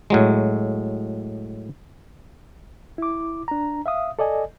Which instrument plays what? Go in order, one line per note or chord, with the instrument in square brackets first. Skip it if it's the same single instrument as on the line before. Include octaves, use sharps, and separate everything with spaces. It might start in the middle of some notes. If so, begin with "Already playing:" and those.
[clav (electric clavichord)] A2 F#3 G#3
[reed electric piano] E4 D6
D4 A#5
E5 F5 D#6
A4 D5 D#5 G#5